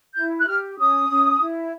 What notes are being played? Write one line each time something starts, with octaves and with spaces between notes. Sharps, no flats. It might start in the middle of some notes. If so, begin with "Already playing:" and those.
E4 G6
F#6
G4 F6
C#4 D#6
C#4
E4